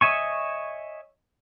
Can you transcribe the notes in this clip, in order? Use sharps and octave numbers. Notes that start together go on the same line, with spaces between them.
C#5 D#5 E5 G#5 C#6